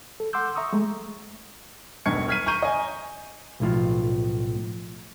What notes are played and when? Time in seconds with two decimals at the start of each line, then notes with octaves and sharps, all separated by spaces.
0.20 A4
0.33 F#5 C6 D6 E6 G6
0.55 E5 A#5 C#6 D#6 E6
0.73 G#3 A3
2.06 E1 B1 G2 C#6 G#6 C#7
2.28 F6 G#6 B6 C7 D#7
2.46 A#5 C#6 G6 D#7
2.62 D#5 G#5
3.60 B1 A2 F3